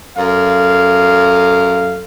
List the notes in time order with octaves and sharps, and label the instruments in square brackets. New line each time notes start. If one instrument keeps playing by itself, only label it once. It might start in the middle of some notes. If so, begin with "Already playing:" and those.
[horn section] F#2 A4 F5